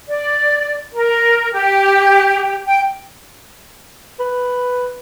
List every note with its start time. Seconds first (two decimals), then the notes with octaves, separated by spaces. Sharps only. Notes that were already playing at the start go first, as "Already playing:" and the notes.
0.08 D5
0.95 A#4
1.53 G4
2.67 G5
4.20 B4